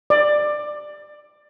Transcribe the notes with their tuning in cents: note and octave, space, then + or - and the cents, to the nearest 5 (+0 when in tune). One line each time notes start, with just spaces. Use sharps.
D5 +20